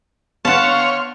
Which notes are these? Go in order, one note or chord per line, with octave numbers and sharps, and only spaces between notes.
B3 D4 C#5 F5 F#5 A5 C6